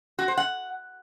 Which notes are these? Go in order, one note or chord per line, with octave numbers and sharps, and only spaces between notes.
F#4
C5
F#5